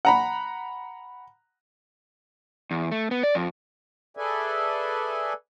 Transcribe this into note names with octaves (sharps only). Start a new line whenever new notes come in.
F#5 A#5 B5
E2
A3
B3
D5
F2
G#4 A4 B4 D5 E5 G#5